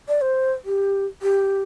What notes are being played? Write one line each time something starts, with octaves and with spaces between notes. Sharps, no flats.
D5
C5
G4
G4